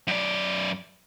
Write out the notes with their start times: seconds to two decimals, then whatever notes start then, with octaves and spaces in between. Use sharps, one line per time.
0.07 F#2 D5